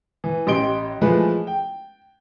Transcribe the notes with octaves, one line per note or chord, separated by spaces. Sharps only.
E3
A1 G4 D#5 C6 D7 G7
E3 F3 G#3 A3 B4
G5